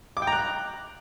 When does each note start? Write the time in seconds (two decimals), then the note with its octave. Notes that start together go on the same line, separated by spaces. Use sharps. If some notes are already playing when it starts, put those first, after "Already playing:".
0.17 D6
0.22 G5
0.27 A#5
0.33 F#6